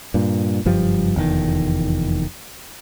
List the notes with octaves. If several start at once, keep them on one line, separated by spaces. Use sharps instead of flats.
G2 A#2
F#1 G2 F3 G3
F1 E2 G2 D#3